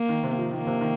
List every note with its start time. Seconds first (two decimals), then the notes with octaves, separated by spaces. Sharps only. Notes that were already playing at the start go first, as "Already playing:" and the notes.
Already playing: A#3
0.09 D#3
0.23 C3
0.39 F3
0.53 D#3 A#3
0.67 C3
0.81 D#3